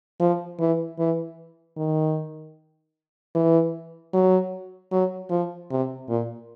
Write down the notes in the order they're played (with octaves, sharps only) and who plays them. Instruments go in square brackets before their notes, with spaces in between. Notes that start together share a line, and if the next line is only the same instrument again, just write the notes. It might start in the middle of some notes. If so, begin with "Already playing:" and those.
[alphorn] F3
E3
E3
D#3
E3
F#3
F#3
F3
C3
A#2